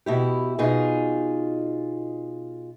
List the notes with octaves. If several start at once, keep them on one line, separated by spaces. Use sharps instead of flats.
B2 E4 G4
B2 D#4 F4 G#4